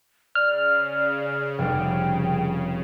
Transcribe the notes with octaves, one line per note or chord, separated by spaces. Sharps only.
C#3 D5 F6
F1 G3 G5